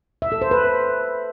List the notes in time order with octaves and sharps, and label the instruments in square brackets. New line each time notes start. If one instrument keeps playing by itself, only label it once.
[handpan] E5
A4
C5
B4